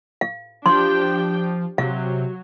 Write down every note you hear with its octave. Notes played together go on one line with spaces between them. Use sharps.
F5
F3 D4 G4 G5 C6
C3 F#3 F5